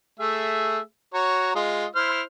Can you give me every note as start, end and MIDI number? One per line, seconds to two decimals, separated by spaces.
0.19 0.79 57
0.19 0.79 68
0.19 0.79 76
1.14 1.54 66
1.14 1.54 73
1.14 1.54 82
1.55 1.86 56
1.55 1.86 65
1.55 1.86 75
1.95 2.22 64
1.95 2.22 72
1.95 2.22 89